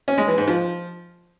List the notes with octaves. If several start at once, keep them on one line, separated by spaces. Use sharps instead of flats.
C#4
G#3
E3
G#2
F3